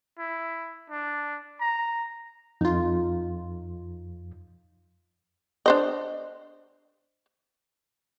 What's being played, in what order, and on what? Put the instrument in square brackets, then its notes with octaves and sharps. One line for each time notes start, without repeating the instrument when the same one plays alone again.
[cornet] E4
D4
A#5
[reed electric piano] F2 [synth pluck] D#4 F4
[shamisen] D4 C5 D#5